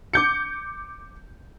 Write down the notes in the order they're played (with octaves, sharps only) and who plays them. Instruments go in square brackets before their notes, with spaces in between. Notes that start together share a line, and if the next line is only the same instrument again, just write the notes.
[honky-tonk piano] D6 G6 C#7